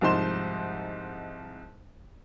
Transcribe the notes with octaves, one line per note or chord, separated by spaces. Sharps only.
C2 G#2 F3 D#4 C6 E7